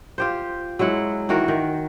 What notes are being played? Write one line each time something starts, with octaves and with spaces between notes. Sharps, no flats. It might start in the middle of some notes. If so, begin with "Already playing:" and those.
F4 G4 C5
F#3 G#3 E4 F#5
D#3 E3 F#4 A#4
D#3